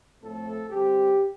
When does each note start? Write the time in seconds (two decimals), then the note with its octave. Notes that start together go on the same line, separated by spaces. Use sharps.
0.21 A2 F3 A3 C4 A4
0.70 D3 G3 C4 G4